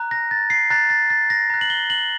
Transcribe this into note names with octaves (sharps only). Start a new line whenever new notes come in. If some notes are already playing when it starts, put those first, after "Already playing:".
Already playing: A#5 F#6
A#6
A6
C7
A#5 F#6 A6
A6
A6
A#6
A#5 F#6
F#7
G7
F#7